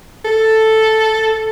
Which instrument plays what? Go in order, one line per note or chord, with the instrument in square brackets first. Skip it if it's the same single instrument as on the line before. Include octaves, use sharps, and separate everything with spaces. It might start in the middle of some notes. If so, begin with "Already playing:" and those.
[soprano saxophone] A4